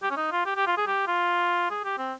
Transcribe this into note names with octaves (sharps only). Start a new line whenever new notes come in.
G4
C#4
D#4
F4
G4
G4
F4
G#4
G4
F4
G#4
G4
C4